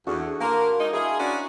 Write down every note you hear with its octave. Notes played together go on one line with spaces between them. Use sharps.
E2 D4 F#4 A4
A#3 A#4 A#5 C6 D6
G#3 D#4
E4 G#4 F5
C#4 D4 F#4